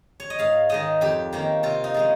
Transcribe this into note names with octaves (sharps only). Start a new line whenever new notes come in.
C#5
D#5
G#2 F5
D#3 G#3 D#4 D#5
F2 G4
D#3 A#3 C#4
C3 F4
D#4
F3 G#3 C#4